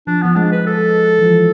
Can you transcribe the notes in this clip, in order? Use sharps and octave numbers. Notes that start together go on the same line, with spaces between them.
F3 D4
F3 B3
G#3 D4
B4
A4
E3
F3